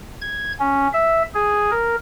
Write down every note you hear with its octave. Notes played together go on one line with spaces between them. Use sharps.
G#6
C#4
E5
G#4
A#4